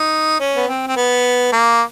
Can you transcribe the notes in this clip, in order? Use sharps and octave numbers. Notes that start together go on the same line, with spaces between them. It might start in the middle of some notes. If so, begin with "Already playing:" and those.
Already playing: D#4
C#4
B3
C4
C4
B3
A#3